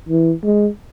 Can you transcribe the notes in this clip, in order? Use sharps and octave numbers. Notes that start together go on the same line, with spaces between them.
E3
G#3